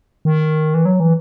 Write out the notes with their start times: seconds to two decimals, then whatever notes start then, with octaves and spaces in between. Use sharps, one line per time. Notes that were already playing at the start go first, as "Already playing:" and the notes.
0.25 D#3
0.74 E3
0.85 F#3
1.00 E3